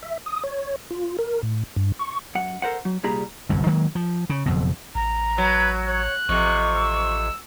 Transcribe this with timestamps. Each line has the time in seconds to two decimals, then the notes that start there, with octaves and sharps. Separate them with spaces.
0.03 E5
0.26 D#6
0.43 C#5
0.90 F4
1.19 A#4
1.43 A2
1.76 G2
1.99 C#6
2.35 F#2 F#5
2.62 A4 A#4 C5 F#5
2.85 F#3
3.03 C2 A#2 G3 G#4 A#5 B5
3.49 G1 C2 F#2
3.66 D#3 F#3 G#3 A#3
3.95 F3
4.30 C#3
4.46 F#1 F2 B2
4.95 A1 A#5
5.38 F#3 B4
5.87 C#5 F#6
6.29 A1 F2 C3 C#6
6.76 E6